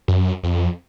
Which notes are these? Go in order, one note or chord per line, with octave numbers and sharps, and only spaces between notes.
F#2
F2